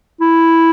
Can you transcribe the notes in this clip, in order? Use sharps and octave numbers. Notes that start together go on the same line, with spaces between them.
E4